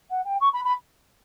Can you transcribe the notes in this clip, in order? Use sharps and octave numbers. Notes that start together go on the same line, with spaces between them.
F#5
G5
C#6
B5
B5